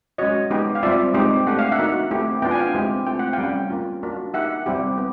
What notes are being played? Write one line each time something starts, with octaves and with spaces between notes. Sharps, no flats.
G#3 C#4 F#4 C#5 D#5
G#3 B3 D#4 G4
F5
G3 C4 F4 D5 E5
G#3 C4 D#4 G4
A3 D4 G4 F#5
F5
E5 F#5
A#3 D#4 F#4
A3 C4 E4 G4
B3 D4 F4 G5
G#5
F5 G5
G#3 C4 E4 G4
A3 C4 F4 G5
F#5
F5 G5
G3 A#3 C#4
A#3 C#4 F4
A#3 D4 F#4
A#3 D#4 G4 E5 F#5
G3 C4 E4 G4
B3